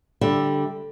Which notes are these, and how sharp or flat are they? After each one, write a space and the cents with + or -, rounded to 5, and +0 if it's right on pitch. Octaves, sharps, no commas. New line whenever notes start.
D3 +0 G3 +0 E5 +0